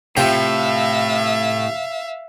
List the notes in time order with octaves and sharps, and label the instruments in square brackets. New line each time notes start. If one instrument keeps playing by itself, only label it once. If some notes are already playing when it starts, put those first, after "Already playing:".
[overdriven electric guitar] A2 [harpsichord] C3 F4 G5 [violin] E5 F5